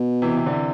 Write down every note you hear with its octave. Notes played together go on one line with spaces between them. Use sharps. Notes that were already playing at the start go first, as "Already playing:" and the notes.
Already playing: B2
C3 E3
C3
D3
C3